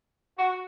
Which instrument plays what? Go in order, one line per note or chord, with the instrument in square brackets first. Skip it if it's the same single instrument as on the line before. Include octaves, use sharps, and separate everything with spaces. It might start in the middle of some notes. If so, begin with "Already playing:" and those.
[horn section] F#4